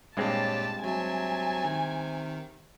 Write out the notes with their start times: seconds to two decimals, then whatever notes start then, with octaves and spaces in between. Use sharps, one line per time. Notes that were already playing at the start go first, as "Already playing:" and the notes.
0.17 G2 A#2 G#3 C4 G4 C#5 A5
0.84 C3 F#3 G#5 A5
1.65 D#3